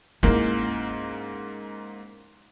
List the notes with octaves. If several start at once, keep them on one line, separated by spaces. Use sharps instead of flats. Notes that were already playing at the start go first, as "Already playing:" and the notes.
G#2 A#3 C#4 E4